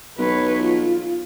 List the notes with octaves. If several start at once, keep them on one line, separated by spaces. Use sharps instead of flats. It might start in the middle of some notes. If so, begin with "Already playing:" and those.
B1 B4 C#5
F4